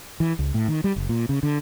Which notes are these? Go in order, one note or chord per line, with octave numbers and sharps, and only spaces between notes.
E3
C#2
A2
D#3
G3
F#1
A#2
C#3
D3